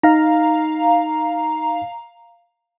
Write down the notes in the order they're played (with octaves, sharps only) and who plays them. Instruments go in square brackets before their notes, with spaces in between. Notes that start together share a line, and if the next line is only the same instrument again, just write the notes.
[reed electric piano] D#4 [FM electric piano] F5 A#5